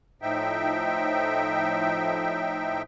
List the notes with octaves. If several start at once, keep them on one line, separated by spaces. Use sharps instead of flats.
A2 F3 D#4 E5 G5